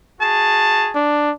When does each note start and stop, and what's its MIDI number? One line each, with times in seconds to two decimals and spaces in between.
0.20 0.93 66
0.20 0.93 68
0.20 0.93 81
0.95 1.32 62